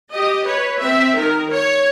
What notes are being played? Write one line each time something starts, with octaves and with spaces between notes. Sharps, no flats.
G4 D#5
B4 C#5
C4 E5
D#3 A#4
C#5